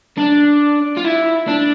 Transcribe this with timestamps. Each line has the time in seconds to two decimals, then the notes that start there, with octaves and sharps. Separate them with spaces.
0.18 D4
0.97 F4
1.04 E4
1.47 D4